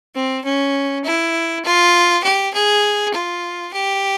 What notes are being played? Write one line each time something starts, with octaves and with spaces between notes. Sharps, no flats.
C4
C#4
E4
F4
G4
G#4
F4
G4